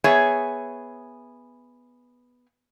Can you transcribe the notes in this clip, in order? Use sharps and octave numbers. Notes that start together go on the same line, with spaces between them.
B3 G#4 C#5 E5